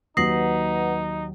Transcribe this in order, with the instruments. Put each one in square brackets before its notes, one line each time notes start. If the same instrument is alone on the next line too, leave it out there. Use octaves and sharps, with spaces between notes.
[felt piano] D#2 F#3 [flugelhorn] D#4 [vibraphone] B4 F#5 [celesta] D#6 A#6 C7